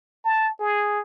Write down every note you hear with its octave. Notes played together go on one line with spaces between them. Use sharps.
A5
G#4